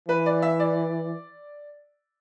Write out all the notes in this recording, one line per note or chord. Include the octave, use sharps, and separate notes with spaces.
E3 B4
D5
E5
D5